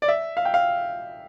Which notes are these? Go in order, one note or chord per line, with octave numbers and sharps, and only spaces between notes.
D5
E5
F5
G5
F5